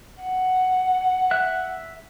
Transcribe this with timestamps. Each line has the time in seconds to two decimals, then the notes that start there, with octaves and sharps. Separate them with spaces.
0.23 F#5
1.31 E5 F#6